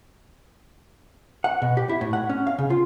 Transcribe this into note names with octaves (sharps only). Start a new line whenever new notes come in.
F#5
B2
G4
E4
A2
F#5
C#4
F5
C#3
F4